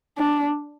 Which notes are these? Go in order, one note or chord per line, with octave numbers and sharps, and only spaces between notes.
D4